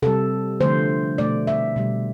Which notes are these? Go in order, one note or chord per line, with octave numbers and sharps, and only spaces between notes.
C3 G3 A4
D3 F3 A3 C5
B2 A3 D5
E5
B2 G3